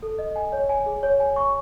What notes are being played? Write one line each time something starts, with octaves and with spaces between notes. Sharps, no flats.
A4
D#5
G#5
C#5
G#5
G#4
C#5
G#5
C#6